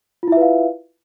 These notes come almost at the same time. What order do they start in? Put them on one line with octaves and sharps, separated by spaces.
F4 E4 E5 B4 F5